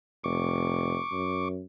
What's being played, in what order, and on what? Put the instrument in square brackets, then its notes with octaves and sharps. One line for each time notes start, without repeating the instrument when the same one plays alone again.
[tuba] F1 [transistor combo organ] C#6 D6
[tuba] F#2